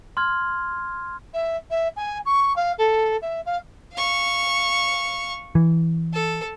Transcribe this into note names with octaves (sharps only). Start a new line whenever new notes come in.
C6 F6 G#6
E5
E5
G#5
C#6
F5
A4
E5
F5
F5 C#6
E3
A4